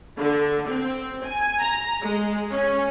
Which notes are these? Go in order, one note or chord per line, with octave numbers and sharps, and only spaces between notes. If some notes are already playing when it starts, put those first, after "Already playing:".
D3
C4
G#5
A#5
G#3
C#4